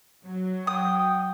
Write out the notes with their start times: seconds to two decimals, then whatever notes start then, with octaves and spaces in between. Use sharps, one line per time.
0.25 F#3
0.67 F#5 G5 D#6